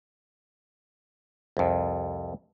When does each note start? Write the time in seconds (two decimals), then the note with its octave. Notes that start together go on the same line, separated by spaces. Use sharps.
1.57 C2 F2